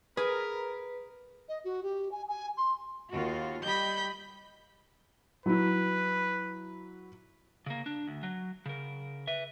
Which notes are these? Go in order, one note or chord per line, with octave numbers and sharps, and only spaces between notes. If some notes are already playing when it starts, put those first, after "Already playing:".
G#4 A#4 B4
D#5
F#4
G4
G#5
G#5
C6
D#2 F4 F#4
G3 G4 D#5 B5 G6
F#3 E4 B4
C#3 A#3
D4
D2
F#3
C#3 A#4
B4 E5